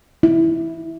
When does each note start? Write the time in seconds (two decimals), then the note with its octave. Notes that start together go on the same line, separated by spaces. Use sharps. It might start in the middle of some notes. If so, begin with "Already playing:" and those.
0.23 E4